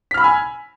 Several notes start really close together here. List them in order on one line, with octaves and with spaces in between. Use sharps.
B6 F6 B5 E6 G#5